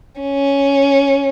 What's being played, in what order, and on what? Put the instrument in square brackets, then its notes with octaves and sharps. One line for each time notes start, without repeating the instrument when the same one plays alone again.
[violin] C#4